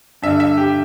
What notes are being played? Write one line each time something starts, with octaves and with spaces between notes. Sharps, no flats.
G2 D3 E5
E5
G4